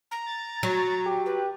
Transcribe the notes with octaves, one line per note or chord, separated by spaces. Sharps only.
A#5
A6
F#3
G4
B4